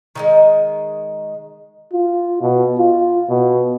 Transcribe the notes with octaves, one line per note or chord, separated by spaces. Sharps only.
D#3 F#3 G#3
F4
B2
F4
B2